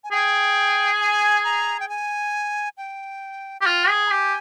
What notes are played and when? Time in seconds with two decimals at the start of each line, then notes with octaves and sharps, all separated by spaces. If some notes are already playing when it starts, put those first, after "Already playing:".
0.04 G#5
0.11 G#4 G5
1.00 G#5
1.44 A#5
1.80 G5
1.89 G#5
2.78 G5
3.61 G4
3.66 F4 G5
3.89 G#4
4.06 A#5
4.11 G4 G#5